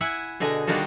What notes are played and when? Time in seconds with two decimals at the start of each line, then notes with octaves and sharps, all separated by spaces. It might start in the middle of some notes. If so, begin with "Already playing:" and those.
0.01 E4 E5 F#5 G#5
0.40 B2 D3 G#4 D#5 G#5
0.67 D#3 G3 A#3 D4 F4 F#4